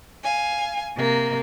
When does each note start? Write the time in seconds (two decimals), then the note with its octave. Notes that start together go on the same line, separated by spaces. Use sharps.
0.23 F5 G#5
0.95 C3 A#3